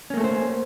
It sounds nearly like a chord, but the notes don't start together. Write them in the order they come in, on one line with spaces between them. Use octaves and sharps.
C#4 A#3 A3 A4 C5